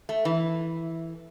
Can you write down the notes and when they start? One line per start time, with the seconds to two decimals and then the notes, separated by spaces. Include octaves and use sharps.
0.09 A3
0.25 E3